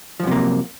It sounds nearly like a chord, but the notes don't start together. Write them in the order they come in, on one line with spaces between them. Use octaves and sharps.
F3 F#2 C3 A#3